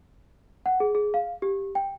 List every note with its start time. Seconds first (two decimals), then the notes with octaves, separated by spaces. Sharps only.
0.66 F#5
0.80 G#4
0.95 G#4
1.14 F5
1.42 G4
1.75 G5